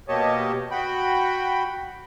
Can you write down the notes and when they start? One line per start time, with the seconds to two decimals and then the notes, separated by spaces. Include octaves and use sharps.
0.08 B2 A#3 G4 C#5 D#5 A5
0.71 F#4 G5 B5